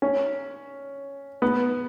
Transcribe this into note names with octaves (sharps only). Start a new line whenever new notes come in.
C#4
B3